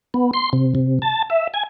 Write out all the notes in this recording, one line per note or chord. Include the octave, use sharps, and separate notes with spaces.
B3
C6
C3
C3
A5
E5
G#5